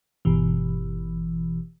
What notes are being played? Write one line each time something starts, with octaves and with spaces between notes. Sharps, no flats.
G1 B2 E3